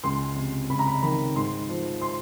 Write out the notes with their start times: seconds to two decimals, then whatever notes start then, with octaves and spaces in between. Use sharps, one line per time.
0.04 C#2 C6
0.36 C3
0.70 C#2 B5
0.79 A#5
0.87 B5
1.03 D#3 B5
1.36 G#2 C6
1.69 F3
2.01 C6